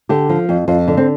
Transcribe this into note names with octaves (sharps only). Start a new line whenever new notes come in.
D3 G4
F3
F2
F2 F4
D3
C4